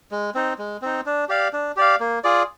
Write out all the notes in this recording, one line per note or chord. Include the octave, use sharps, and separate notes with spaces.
G#3
C4 D#4
G#3
C4 D#4
D4
G4 D5 F5
D4
G4 D5 F5
A#3
F4 G#4 D5